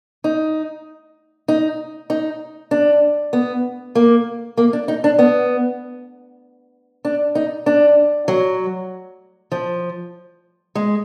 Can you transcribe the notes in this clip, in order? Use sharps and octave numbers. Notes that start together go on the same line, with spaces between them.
D#4
D#4
D#4
D4
B3
A#3
A#3
D4
D#4
D4
B3
D4
D#4
D4
F#3
F3
G#3